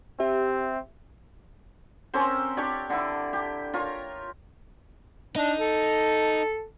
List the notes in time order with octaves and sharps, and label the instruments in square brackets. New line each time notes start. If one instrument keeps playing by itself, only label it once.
[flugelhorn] C4 [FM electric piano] G4 E5
[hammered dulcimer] C4 C#4 A#4 C5
D4 G4 C#5 D5
D3 E4
G4
F4 A#4 C#5
[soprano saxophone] D4 [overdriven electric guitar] D#4
[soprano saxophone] A4